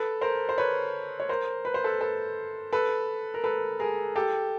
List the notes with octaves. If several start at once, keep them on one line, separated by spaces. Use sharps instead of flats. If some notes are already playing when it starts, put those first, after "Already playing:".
Already playing: A4 B4
A#4 C5
C5
B4 C#5
C#5
A#4 C5
B4
C5
A4 B4
A4 B4
A4 B4
A#4
A4 B4
G#4 A#4
G4 A4